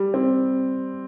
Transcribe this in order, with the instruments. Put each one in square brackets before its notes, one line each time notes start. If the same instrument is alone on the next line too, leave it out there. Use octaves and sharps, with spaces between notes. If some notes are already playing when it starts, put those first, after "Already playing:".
Already playing: [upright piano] G3
C4